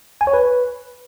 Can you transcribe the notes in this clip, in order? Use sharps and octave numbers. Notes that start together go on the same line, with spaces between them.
G#5
C#5
B4